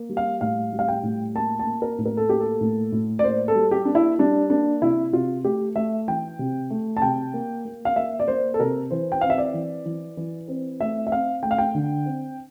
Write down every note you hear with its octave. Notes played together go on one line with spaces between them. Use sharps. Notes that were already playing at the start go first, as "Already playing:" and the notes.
Already playing: A#3
G3
F5
A2 F5
G3
F5
G5
A2
A#3 A5
A5
A#3
A#4
A2
A#4
A4
A#3 G4
A4
A2
A2
D5
A#3 C5
A4
G3
G4
A#3 D4
E4
G3 D4
A#3 D4
C3 E4
C3 F4
A3 G4
A3 E5
E3 G5
C3
A3
A5
C3 G5
A#3
A#3
F5
A#3 E5
D5
A#3 C5
A4
C3 A#4
E3 C5
G5
C4 F5
E5
D5
E3
E3
E3
C4
A3 E5
E5
C4 F5
A3 G5
F5
G5
D3
C4